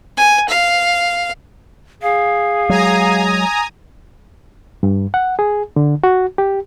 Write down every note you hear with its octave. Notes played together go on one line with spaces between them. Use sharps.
G#5
F5
G#4 F5
F#3 G#3 G#5 A#5 D#6
G2
F#5
G#4
D3
F#4
G4